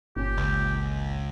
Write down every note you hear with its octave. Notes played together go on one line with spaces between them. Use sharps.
G1 A#2 C#4 G4
C#2